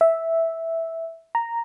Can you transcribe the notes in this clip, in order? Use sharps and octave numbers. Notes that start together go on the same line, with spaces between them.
E5
A#5